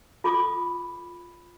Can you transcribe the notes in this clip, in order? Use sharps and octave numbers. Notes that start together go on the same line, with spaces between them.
F4 A4 B5 D6 D#6